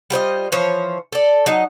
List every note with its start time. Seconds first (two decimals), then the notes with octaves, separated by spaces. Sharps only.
0.10 G3 F4 C5 D#5
0.52 E3 F3 C5 C#5
1.12 A4 D5
1.46 F#3 D#4 D#5